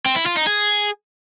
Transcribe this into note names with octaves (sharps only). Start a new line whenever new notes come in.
C4
E4
F4
D#4
G#4